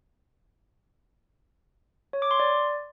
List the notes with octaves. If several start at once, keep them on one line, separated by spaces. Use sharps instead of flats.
C#5
D6
C6
D5